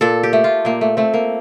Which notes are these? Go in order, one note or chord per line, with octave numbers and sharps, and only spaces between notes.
A#2 A4
G4
A3
F4
A#2 A#3
A3
A3 C4
A#3